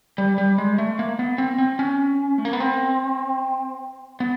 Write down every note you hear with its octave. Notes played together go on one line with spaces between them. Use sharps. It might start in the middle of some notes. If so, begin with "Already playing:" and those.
G3
G3
G#3
A3
A#3
B3
C4
C4
C#4
A3
A#3
B3
C4
B3